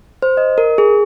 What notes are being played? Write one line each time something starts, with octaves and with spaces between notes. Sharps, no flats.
C5
D#5
A#4
G#4